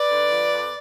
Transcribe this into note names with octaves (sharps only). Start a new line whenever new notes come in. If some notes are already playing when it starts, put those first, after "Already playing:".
Already playing: B4 D5
D3
F3
F2